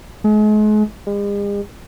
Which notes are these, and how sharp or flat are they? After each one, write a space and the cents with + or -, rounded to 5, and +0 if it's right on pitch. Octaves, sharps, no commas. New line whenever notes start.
G#3 +40
G#3 -45